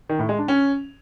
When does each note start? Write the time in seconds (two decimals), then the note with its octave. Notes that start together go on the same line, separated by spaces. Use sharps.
0.09 D#3
0.19 A2
0.29 G#3
0.39 D4
0.48 C#4